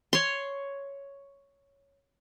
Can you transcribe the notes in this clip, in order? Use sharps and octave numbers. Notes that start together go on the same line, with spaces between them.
C#5 C6